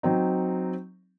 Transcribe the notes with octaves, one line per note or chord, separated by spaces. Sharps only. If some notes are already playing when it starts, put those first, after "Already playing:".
F#3 C4 D#4